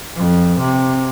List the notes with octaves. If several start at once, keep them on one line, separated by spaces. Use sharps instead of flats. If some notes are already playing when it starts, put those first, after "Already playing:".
F2
C3